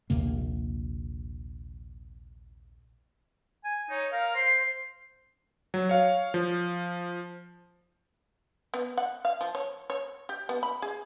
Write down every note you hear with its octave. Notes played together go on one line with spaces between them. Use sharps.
A#1 D#2 C3 A#3
G#5
D#4 C#5
A#4 F5
C5 C6
F#3
C#5 F5
F3
B3
F#5
F5
F3
C#5
C#5
G4
B3
B5
G#4